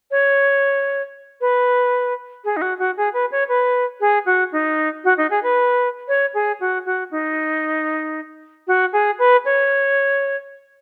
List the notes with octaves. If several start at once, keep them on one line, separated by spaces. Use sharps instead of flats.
C#5
B4
G#4
D#4
F#4
F#4
G#4
B4
C#5
B4
G#4
F#4
D#4
F#4
D#4
G#4
B4
C#5
G#4
F#4
F#4
D#4
F#4
G#4
B4
C#5